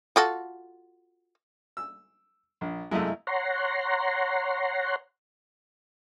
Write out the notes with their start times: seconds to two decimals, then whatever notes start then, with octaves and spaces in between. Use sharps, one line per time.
0.16 F4 F#4 A4
1.77 E6
2.61 A#1
2.91 F#2 C3 G#3 A3 E4 D#5 F5
3.27 C#5 F#5 A#5 C6